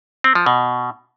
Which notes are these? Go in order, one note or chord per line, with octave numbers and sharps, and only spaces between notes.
C4
F3
B2